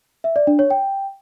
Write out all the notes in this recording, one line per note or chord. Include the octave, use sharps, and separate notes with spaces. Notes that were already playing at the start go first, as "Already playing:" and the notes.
E5
D5
D4
C#5
G5